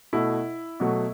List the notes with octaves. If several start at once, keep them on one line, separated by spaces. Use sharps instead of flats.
B2 A3 E4
B2 F#3 A3